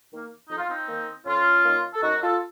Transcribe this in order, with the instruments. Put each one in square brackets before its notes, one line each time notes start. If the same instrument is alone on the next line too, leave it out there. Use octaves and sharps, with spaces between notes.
[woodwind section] D#3 A#3
F2 D#4
F4
C4 D#4
D#3 A#3
F2 C#4 F4
D#3 A#3
A4
F#2 D#4 F#4
F4 A4